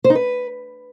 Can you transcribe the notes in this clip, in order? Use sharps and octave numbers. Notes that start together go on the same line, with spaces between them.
C5
D#4
B4